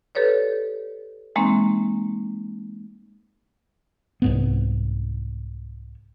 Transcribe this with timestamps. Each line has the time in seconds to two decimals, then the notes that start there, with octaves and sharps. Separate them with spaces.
0.15 G4 A4 B4 C#5 D5
1.36 E3 G#3 A#3 C4 C#4 D#4
4.22 C2 G#2 B3